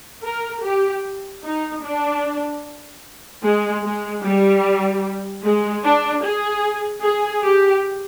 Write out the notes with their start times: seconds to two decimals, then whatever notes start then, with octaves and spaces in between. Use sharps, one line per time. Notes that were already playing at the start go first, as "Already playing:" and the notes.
0.24 A#4
0.63 G4
1.44 D#4
1.83 D4
3.43 G#3
3.83 G#3
4.23 G3
5.43 G#3
5.84 D4
6.23 G#4
7.03 G#4
7.43 G4